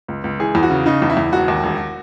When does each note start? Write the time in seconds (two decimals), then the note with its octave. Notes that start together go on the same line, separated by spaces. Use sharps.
0.08 C#2
0.24 C#2
0.40 E3 G#4
0.55 E2
0.63 F#4
0.70 C#3
0.86 C#3 D#4
1.02 E2
1.10 E4
1.17 E2
1.32 E1 F#4
1.48 D#2
1.63 E1